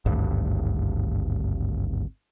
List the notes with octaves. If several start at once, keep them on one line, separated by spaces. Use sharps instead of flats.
G#1 D2 G2